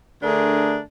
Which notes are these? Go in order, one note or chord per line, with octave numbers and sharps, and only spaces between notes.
D3 A3 D4 G#4 A#4